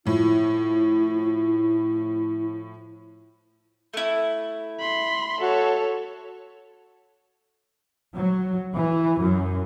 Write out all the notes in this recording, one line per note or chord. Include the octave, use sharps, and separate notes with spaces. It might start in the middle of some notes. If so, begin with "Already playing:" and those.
A2 F3 E4
A3 E4
B5 C6
F#4 A4 C#5
F#3
E3
F#2